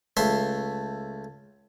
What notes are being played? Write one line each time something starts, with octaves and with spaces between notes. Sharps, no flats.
C#2 A3 E5 C6